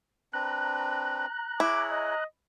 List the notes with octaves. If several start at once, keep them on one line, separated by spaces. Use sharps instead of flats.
C4 D4 B4 A#5 F#6
E4 G#4 C#5 D6
D#5